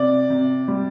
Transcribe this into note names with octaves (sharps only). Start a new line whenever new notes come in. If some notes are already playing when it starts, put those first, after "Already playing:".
Already playing: C3 D5
C3
G3